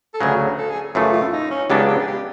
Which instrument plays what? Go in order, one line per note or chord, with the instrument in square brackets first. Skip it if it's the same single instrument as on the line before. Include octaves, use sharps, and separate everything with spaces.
[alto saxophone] A4
[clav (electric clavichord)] D2 C#3 F#3 [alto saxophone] G#4
[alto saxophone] A4
G#4
[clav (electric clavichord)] F#2 C#3 E3 A3 [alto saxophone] F4
[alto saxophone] F4
D#4
C#4
[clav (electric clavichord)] C#2 C#3 F#3 B3 D4 [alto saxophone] G4
[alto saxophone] G4
G#4
G4